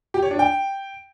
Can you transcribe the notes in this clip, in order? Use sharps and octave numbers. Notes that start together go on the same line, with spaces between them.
G4
C#5
D4
G5